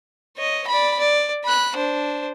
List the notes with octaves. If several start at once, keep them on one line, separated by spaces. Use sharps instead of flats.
C#5 D#5
D5 B5
D5
B5 F#6
D4 C5